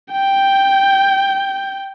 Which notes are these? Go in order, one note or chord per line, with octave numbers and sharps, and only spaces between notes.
G5 G6